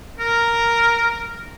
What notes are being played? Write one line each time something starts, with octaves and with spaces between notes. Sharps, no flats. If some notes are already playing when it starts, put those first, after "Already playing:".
A#4